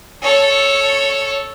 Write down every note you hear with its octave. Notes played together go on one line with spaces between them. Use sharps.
A4 C#5